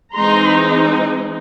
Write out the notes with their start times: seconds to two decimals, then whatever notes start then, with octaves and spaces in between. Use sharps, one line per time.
0.15 E3 G#3 C4 D#4 A#5 C6